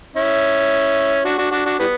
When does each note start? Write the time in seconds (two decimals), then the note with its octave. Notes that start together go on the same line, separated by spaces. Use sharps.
0.16 C#4 E4
1.25 D4 F#4
1.38 D4 F#4
1.51 D4 F#4
1.65 D4 F#4
1.79 E3 G3 B3